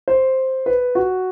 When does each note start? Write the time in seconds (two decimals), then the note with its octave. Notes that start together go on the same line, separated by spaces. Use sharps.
0.08 C5
0.66 B4
0.95 F#4